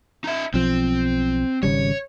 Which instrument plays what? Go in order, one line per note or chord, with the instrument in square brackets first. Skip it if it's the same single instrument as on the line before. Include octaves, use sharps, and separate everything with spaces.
[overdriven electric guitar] D#4 E5
[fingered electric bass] B1 F3 [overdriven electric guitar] C4
[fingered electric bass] G#1 C#3 G3 [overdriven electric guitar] C#5